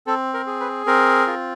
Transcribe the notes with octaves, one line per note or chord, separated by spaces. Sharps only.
C4 A4
A#4
G#4
B4
C4 A#4
F4